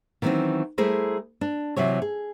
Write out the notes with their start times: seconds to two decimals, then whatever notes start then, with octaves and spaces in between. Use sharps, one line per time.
0.22 D#3 E3 F#3 A#3 C4 C#4
0.78 G3 A3 E4 G#4 A#4 C5
1.41 D4
1.76 C3 E3 F#3 C#5
2.02 G#4